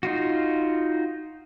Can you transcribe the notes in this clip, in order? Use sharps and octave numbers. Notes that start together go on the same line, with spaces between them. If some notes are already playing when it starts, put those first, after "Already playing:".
D#4 F4 F#4